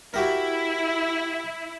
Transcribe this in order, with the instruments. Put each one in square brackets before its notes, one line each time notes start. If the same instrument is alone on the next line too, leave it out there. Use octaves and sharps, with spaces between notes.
[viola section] E4 [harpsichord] F#4 G4 A#4